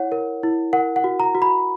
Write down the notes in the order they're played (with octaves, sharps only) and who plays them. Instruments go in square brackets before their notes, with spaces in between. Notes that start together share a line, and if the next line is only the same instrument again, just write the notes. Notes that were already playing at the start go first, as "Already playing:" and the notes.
Already playing: [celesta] E4 C#5 F#5
A#4
E4
A#4 F#5
F#5
F#4
A#5
F#4
B5